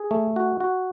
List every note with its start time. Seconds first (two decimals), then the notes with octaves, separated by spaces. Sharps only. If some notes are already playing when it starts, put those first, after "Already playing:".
Already playing: G#4
0.11 A3
0.36 F#4
0.60 F#4